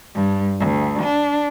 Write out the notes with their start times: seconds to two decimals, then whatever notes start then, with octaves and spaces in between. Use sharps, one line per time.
0.15 G2
0.59 D2
1.02 D4